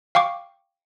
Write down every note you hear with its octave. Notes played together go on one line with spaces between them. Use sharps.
F5 G5 C#6 D6